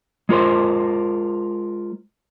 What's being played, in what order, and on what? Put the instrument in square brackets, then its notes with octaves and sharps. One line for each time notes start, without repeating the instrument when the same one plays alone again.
[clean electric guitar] G#3 F4 A#4 C5